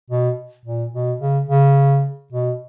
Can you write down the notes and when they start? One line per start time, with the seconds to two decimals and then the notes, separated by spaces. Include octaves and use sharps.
0.10 B2
0.66 A#2
0.93 B2
1.21 C#3
1.49 C#3
2.32 B2